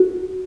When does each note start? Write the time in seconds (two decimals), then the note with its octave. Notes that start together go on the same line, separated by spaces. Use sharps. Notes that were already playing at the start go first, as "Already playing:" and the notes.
Already playing: F#4